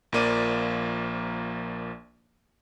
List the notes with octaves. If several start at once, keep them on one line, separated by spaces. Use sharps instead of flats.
A#1 F3 A#3 D5 D#7